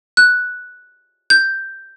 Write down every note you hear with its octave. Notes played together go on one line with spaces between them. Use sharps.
F#6
G6